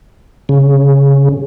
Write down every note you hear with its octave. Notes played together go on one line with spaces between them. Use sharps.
C#3